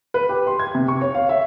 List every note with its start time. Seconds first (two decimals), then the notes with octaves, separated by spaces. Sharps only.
0.14 B4
0.29 G4
0.47 C6
0.59 G#6
0.75 C3
0.88 C#6
1.01 C#5
1.15 F5
1.29 E5